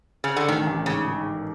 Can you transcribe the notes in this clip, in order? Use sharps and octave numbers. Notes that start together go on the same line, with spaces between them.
C#3
D3
A1 D#3
A1
G#2 C#3
D#3